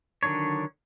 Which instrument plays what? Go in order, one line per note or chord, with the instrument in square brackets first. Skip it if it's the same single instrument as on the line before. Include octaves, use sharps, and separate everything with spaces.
[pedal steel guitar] D3 D#3 F#3 D4 C#5